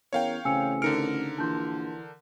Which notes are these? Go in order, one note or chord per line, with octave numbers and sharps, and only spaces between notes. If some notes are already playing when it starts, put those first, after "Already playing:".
E2 C#4 A#4 C#5 F5 G5
A1 C#3 C4 G#5 E6 C#7
D3 D#4 A#4 F6 C#7 D7
A#1 E3 A5 C6 G6